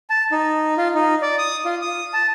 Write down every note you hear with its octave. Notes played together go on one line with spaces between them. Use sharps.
A5
D#4
F4
D#4
D5
D#6
F4
D#6
A5